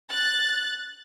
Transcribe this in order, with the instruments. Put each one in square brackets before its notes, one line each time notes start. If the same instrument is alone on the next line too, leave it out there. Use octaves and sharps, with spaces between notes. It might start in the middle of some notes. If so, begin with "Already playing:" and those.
[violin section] F#6 A6